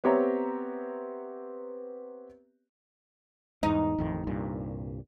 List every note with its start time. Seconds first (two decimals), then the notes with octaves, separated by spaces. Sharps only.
0.04 B3 C4 G4 C#5 E5 A#5
3.63 E2 G#2 D#4
3.98 A1 F2 D#3
4.27 C2 G2 A#2